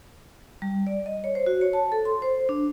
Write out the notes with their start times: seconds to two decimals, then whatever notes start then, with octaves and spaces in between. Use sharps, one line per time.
0.62 G3
0.87 D5
1.06 D#5
1.24 C#5
1.35 C5
1.46 F#4
1.61 C#5
1.73 A5
1.92 A4
2.05 C6
2.22 C5
2.49 D4